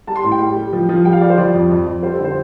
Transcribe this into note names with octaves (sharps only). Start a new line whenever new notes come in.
G3 A5
C6
A2
G5
G3
G3
F3
F3
G3 G5
F5
G3 D5
C5
F3 D5
F2
F2
F2
G3 C5
A4
D3
C5